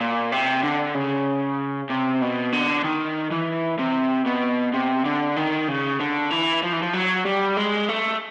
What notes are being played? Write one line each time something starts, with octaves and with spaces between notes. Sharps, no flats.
A#2
C3
D3
C#3
C3
B2
D3
D#3
E3
C3
B2
C3
D3
D#3
C#3
D3
E3
F3
E3
F3
F#3
G3
G#3
A3